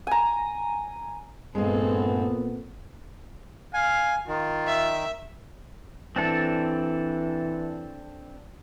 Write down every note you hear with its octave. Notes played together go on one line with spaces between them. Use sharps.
G#5 A#5
G2 A#2 G#3 B3 C4 G#4 A4
F5 G#5
D#3 F4
E5
E3 C4 D4 A4